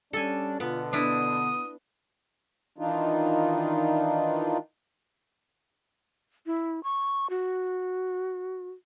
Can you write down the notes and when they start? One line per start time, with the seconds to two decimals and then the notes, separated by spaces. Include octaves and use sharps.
0.13 G3 C#4 D4 A4 G#5
0.60 B2 D3 B3 F4
0.93 B3 D4 E4 D#6
2.78 D#3 E3 D4 D#4 F4
6.46 E4
6.84 C#6
7.30 F#4